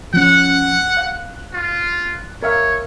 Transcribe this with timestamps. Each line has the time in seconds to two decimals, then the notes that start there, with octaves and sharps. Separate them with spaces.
0.14 F3 C#4 F#5
0.97 F5 F#6
1.54 F4
2.43 A#4 C#5 E5 F5